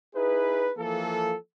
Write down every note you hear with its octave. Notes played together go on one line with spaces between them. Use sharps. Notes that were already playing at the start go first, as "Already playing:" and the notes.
D#4 E4 G#4 B4
E3 F3 A#3 A4